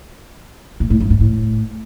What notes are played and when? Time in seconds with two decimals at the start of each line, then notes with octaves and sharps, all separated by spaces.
0.80 A#2
0.90 A2
1.00 G2
1.10 G#2
1.20 A2